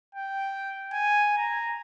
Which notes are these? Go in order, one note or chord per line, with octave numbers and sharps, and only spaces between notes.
G5
G#5
A#5